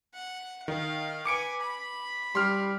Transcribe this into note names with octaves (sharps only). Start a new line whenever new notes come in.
F#5
D#3 F5
B4 G#5 D6 C#7 D7
B5
G3 C6 F6